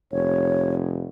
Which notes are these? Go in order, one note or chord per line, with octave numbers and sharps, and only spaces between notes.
F1 C#5